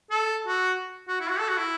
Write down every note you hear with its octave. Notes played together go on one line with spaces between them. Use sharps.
A4
F#4
F#4
E4
F#4
A4
F#4
E4